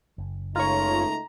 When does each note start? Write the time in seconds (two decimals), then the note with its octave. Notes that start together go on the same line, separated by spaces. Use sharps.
0.18 F#1
0.56 C#2 A3 D#4 F4 C#5 A#5